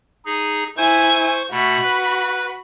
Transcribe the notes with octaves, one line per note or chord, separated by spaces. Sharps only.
D#4 G#4
E4 C5 G#5 C#6
B2 A3 F#4 B5
B4